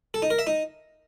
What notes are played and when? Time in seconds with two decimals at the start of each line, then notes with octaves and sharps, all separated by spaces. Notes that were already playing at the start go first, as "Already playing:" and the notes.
0.14 A4
0.22 D#4
0.30 A#4
0.39 E5
0.47 D#4